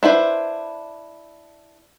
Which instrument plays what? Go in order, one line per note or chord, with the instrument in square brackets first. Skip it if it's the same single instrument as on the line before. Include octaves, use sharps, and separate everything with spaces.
[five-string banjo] D4 E4 B4 C5